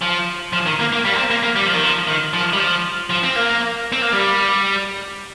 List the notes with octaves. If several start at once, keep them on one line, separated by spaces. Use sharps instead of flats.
F3
F3
D#3
A#3
A#3
G3
A#3
C4
A#3
A#3
G3
F3
D#3
F3
D#3
F3
G3
F3
F3
C4
A#3
C4
A#3
G3